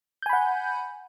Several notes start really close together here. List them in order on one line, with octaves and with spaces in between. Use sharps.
G6 G#5 B5 F#5